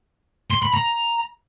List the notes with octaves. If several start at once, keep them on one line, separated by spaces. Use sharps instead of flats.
C6
B5
A#5